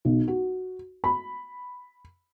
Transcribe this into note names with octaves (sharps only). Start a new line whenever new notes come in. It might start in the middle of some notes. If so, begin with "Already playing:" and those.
B1
F#4
B5